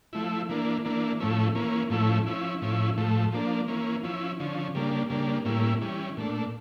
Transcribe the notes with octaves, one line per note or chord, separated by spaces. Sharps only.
F3 A3 E4
E3 A#3 D4
E3 A#3 D4
A2 F3 A3 C#4 E4
E3 A#3 C#4
A2 F3 A3 C#4 E4
F3 C#4 E4
A2 F3 C#4 E4
A2 F3 A3
F3 A#3 D4
E3 A#3 C#4
F3 C#4 E4
D3 F3 C#4
C#3 G3 A#3 D4
C#3 G3 A#3 D4
A2 G3 A#3 C#4 E4
E3 G3 C#4
A#2 A3 D4